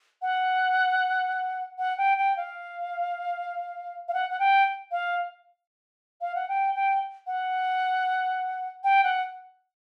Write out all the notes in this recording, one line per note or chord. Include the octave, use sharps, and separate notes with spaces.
F#5
F#5
G5
G5
F5
F5
F#5
F#5
G5
F5
F5
F#5
G5
G5
F#5
G5
F#5